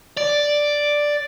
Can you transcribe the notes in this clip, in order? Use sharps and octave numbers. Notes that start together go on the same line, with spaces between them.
D5